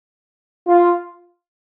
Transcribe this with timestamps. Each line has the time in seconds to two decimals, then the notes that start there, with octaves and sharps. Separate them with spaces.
0.67 F4